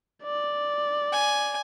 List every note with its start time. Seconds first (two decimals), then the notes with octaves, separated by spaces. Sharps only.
0.24 D5
1.13 G#5